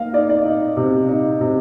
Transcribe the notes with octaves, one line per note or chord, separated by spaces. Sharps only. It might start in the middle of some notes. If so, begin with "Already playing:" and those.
Already playing: A#3 D#4 D#5 F5
D#4 D5
D5
D#4
C3
D#4
C3